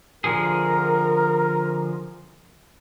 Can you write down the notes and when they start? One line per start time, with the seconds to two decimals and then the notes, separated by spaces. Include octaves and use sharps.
0.24 D3 F3 G#4 A#4